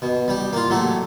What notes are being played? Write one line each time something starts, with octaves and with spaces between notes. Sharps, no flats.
B2
G3 G4
A#3 F4
F#3 A3 G4